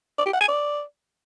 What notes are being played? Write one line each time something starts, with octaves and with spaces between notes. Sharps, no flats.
D5
G4
F#5
G#5
D5